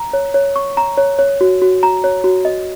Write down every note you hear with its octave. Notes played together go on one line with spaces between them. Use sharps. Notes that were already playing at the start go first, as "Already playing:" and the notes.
Already playing: A#5
C#5
C#5
C#6
A#5
C#5
C#5
F#4
F#4
A#5
C#5
F#4
D#5